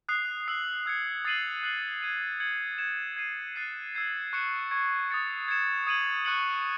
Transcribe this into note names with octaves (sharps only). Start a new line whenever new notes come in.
D#6 F#6 C7
E6 C7 F#7
E6 G#6 C#7
D#6 A6 C7 D#7 F#7
F#6 C7 F#7
G#6 D#7 F#7
G#6 C#7 F#7
G#6 C#7 E7
G#6 C7 D#7
F#6 A6 C7 D#7
E6 G#6 C7
C#6 F#6 C#7 E7
C#6 G#6 C#7
D#6 A6 C#7
G#6 C#7 E7
D#6 G#6 D#7 F#7
C#6 F#6 C#7 F#7